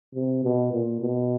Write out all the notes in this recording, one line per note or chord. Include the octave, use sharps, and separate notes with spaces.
C3
B2
A#2
B2